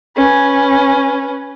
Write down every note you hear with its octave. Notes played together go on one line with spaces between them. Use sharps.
C#4 B4